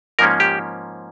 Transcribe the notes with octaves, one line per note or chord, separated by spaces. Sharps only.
G#2 F3 A#3 C#4 A#4
G4